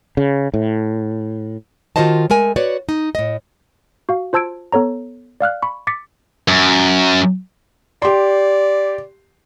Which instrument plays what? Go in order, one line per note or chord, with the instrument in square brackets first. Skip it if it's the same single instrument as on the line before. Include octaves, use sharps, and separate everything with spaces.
[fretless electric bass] C#3
A2
[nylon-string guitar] D#3 F4 F#4 C5 D#5 A5
G#3 A3 A#4 G#5
F#4 B4 C#5 D5
D#4
A2 D#5
[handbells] F#4 F5
F4 C5 A5 E6 G#6 D7
B3 A4 C#5 A#5
D5 F5 F6 F#6
B5 C#6
D6 A6 B6 C#7
[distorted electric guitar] F#2
[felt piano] G4 C6 [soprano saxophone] D5